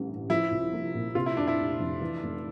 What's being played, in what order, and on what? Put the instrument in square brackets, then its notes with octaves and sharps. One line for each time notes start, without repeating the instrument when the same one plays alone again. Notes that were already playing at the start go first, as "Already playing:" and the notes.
Already playing: [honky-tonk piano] A1 D3 G3
G2
[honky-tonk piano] F3 [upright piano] E4
[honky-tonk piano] C2
A#3
A#2
[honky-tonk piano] C3 [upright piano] F4
[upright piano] E4
[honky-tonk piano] F1 [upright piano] D4
[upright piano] E4
[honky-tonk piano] F1
F2
E3
F1